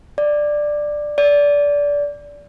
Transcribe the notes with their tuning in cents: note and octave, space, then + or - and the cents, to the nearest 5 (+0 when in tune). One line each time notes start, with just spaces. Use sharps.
D5 +10
D5 -20